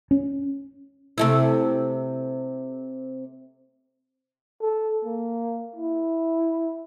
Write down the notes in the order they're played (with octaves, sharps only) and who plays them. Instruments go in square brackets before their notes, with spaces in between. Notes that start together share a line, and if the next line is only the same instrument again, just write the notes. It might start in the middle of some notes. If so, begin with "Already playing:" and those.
[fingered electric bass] C#4
[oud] C3 A3 E4
[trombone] A4
A#3
E4